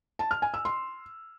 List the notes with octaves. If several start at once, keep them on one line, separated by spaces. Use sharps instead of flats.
A5
F6
G#5
E6
C6